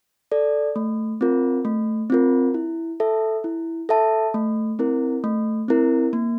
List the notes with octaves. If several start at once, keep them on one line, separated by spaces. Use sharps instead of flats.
A4 D5
A3
C4 F4 A#4
A3
C4 F4 A#4
E4
A4 E5 A5
E4
A4 E5 A5
A3
C4 E4 A#4
A3
C4 E4 A#4
A#3